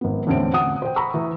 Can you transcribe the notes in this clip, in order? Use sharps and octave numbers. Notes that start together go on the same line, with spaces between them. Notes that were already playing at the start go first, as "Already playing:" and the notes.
G#1 B3
E2 A2 D3 C4 C#4 D7
F#5 D#6
C5 G5
A#5 B5 C#6 E6
E3